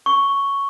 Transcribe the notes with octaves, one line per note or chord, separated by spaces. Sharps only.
C#6